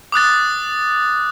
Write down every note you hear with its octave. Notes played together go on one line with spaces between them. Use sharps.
D6 D#6 F#6 A6